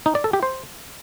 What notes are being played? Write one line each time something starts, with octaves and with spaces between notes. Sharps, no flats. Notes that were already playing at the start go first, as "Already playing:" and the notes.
D#4
D5
A4
G4
C5